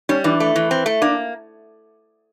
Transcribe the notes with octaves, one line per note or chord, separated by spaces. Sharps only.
G3 C#4
E3 D4
A3
E3
C4
A3
A#3 D4